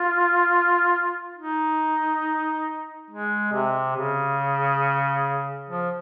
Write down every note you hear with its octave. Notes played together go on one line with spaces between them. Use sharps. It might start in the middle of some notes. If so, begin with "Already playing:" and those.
Already playing: F4
D#4
G#3
C3
C#3
F3